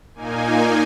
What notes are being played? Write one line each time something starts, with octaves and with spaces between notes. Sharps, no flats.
A#2 A#3 D#4 G#5